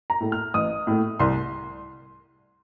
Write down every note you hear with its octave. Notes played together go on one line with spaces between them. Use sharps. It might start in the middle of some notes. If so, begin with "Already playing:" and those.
A#5
A2 A3
F6
A1 D#6
A2 A3
C2 C6